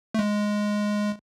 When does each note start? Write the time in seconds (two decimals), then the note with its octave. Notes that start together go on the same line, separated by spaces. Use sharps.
0.14 A3
0.19 G#3